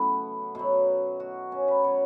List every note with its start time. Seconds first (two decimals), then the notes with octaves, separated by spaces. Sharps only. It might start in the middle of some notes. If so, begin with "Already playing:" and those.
Already playing: F#2 C#3 E3 A3 B3
0.55 B2 F#3
1.20 F#4
1.52 C#4
1.68 B4
1.84 B2 F#3 C#5